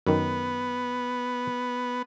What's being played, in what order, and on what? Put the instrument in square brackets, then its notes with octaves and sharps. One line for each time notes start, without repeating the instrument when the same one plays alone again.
[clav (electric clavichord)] F#2 D#3 [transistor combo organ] B3